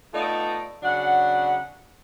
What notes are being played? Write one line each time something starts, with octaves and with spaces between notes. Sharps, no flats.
A3 B3 D#4 F4 D5
C#3 F#3 D4 F#5